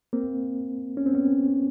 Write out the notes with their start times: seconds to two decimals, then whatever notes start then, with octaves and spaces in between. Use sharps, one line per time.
0.13 A#3 C4
0.97 C#4
1.06 C4
1.14 B3 C#4